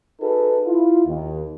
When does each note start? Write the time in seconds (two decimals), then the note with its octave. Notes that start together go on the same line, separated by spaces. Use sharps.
0.21 D#4 F#4 G#4 A4 B4
0.67 E4 F4
1.06 D#2